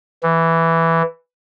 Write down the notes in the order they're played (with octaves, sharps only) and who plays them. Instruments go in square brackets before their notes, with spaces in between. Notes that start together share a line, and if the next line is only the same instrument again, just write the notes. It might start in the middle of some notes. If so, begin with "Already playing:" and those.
[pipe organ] E3